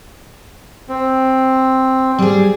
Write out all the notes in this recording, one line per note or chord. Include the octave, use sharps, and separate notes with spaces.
C4
G3 G#4